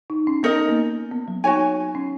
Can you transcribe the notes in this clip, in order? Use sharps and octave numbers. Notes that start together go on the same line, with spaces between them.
D#4
C#4
B3 D#4 A#4 D#5
A#3
B3
F#3
D#4 F#4 C#5 G#5
C#4